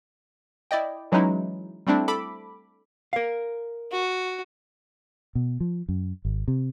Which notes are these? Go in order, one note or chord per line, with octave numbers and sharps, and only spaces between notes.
E4 D5 D#5 G5
E3 F#3 G#3 C#4 D#4 E4
G3 A3 C4 D4 E4
A4 B5 D6
A#4 F5
F#4
B2
F3
F#2
G#1
C3